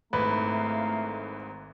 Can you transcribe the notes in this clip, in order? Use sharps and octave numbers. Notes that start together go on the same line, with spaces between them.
G#1 G#2 A3 E4 B4 F5 A#5